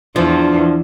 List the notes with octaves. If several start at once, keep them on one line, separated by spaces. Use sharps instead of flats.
E2 E3 F3 D4